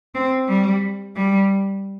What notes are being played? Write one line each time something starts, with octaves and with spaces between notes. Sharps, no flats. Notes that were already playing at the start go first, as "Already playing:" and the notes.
C4
G3
G3